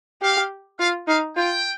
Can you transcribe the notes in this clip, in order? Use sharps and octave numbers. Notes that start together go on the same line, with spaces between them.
G4 F5
F4 F5
D#4 F5
F4 G5